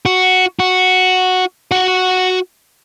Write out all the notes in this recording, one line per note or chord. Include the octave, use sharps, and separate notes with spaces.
F#4
F#4
F#4 F#5